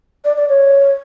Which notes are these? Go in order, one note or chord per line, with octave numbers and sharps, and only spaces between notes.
D5
D5
C#5